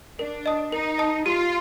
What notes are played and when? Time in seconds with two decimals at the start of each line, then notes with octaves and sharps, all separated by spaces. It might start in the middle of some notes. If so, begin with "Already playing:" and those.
0.18 D4 A#4
0.46 D#5 A5 D#6
0.72 D#4 A#4
0.98 D#5 A5 D#6
1.26 F4 G4